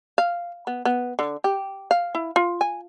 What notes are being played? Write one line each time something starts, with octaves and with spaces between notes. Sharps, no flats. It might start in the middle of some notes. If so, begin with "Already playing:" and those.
F5
B3
B3
D3
G4
F5
E4
F4
G#5